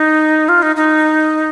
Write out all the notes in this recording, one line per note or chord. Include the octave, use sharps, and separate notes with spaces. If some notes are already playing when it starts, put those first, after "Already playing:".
Already playing: D#4
F4
D#4
D#4